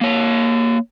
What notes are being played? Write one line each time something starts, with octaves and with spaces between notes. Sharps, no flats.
A#3 C#5